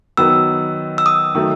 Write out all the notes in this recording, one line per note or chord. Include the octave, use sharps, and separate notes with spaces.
D#3 F#3 B3 E6
E6
D#6
D#3 F#3 A3